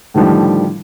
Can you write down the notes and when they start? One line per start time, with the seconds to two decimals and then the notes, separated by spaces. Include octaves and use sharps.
0.14 A2 D3 D#3 F3 G3